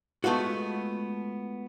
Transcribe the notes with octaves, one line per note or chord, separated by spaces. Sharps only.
G#3 A3 B3 F4 F#4